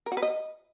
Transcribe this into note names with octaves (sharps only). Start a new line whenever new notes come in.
A#4
F#4
B4
D#5